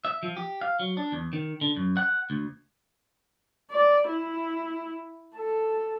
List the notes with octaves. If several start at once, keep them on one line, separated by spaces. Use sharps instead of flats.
E5
F3
G4
F5
F#3
D4
E2
D#3
D3
F#2
F#5
D2
D5
E4
A4